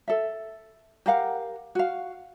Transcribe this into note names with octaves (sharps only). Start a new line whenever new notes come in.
A4 E5
G4 A#4 F5 F#5
F#4 F5